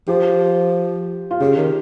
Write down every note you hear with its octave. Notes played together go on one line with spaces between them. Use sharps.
F3 G4
F4
C#3 G4
D#3